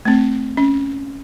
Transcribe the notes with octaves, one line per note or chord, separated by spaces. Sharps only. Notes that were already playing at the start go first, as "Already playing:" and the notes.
A3 C4
C#4